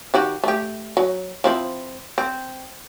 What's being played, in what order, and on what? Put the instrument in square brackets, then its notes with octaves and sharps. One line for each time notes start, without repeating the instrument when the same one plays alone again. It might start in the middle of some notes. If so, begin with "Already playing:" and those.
[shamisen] D#3 F#4 G4
A3 G4
F#3
F3 C4 E4
C4